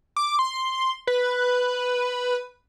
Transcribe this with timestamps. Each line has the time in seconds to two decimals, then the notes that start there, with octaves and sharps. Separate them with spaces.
0.16 D6
0.39 C6
1.07 B4